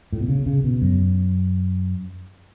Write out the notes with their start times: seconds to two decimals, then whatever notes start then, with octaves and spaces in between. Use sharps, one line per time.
0.13 A2
0.20 B2
0.28 C#3
0.46 C#3
0.64 B2
0.82 F#2